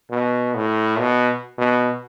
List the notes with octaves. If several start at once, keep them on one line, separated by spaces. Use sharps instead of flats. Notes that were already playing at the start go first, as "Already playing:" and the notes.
B2
A2
B2
B2